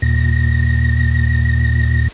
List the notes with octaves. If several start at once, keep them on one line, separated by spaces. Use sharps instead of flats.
D#2 A#2 A#6